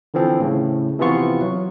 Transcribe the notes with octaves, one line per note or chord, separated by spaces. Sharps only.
D3 E3 F3 C4
A2 C#3
C3 E3 F3 B3 F4 C#6
F#3